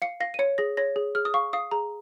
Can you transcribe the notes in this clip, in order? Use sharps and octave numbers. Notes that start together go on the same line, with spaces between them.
F5 C#7
F5 A#6
D#7
C#5 C#7
G#4 A#6
C#5 A#6
G#4
G#4 F6
D#6
F5 C#6
F5 D#6
G#4 A#5